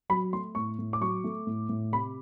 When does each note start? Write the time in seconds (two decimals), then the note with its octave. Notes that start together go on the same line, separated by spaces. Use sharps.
0.09 F#3 B5
0.33 A3 C6
0.55 A2 C#6
0.79 A2
0.93 D6
1.01 F#3 C#6
1.24 A3
1.47 A2
1.69 A2
1.92 C3 B5